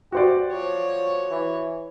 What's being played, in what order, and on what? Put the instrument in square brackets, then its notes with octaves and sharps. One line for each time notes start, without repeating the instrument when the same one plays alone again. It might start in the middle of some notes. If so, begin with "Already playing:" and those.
[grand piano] F#4 C5 D5 [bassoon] G4
[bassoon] F3 [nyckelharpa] C#5
[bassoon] E3